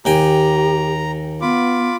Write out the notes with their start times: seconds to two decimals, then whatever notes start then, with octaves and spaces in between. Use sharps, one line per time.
0.05 D#2 G4 G5 G#5 A#5
1.41 B3 F4 B5 D6